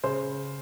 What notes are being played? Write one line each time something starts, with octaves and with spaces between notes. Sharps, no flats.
C#3 C5